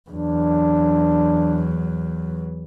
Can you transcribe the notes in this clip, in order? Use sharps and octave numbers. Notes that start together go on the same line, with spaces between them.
E2 F#3 D4